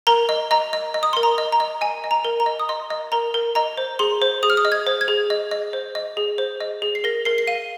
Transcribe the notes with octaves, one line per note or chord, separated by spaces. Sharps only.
A#4 A#5
D#5
D#5 A#5
D#5
D#5
D#6
A#4 C6
A#5
D#5
A#5
D#5
D#5 G#5
D#5
A#5
A#4
A#5
D#5
D#6
D#5 C6
D#5
A#4 A#5
A#4
D#5 A#5
C5
G#4 C6
C5
G#4 D#6
F6
D#6
D#5
G#6
C5
G#6
G#4
D#5
D#5
C5
D#5
G#4
C5
D#5
G#4
C7
A#4 A#6
A#4 C7
C7
F5 D#7